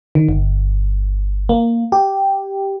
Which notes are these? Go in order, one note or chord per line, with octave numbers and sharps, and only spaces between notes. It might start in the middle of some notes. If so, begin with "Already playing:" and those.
D#3
G1
A#3
G4